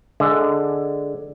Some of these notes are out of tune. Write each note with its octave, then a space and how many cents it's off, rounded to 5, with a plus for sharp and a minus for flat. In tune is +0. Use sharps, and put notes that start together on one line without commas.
D3 +0 G#3 +5